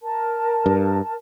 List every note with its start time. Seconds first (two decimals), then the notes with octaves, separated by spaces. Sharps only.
0.03 A#4 A5
0.66 G2